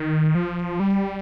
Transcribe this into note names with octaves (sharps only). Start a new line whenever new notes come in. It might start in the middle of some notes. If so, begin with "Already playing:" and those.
Already playing: D#3
F3
G3